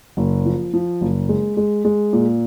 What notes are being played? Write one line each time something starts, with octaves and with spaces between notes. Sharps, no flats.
F#1
F3
F3
F#1
G#3
G#3
G#3
A#2